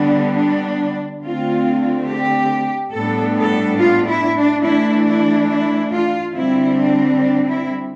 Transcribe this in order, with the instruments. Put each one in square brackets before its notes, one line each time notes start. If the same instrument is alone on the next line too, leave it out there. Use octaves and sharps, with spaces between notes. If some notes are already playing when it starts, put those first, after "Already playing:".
Already playing: [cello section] D3 G3 B3 D4
D4
D3 A3 C4 F4
G4
A2 G3 B3 D4 A4
A4
F4
E4
D4
E3 A3 D4 E4
E4
E4
F4
D3 G3 C4 E4
D4
D4
E4